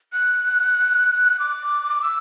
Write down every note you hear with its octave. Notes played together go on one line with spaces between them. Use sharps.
F#6
D6
E6